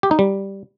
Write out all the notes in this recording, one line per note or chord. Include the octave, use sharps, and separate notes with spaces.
G4
D#4
G3